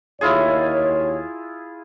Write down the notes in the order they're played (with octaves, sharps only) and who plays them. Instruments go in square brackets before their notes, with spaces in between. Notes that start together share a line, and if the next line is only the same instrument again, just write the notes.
[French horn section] D#2 C#5 [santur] E4 F4 G#4